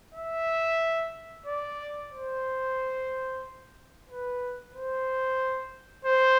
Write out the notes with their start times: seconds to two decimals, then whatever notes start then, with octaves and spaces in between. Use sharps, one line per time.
0.15 E5
1.46 D5
2.11 C5
4.08 B4
4.74 C5
6.05 C5